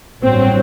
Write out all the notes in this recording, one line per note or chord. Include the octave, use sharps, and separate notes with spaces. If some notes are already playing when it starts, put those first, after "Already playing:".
A1 G2 F#3 C4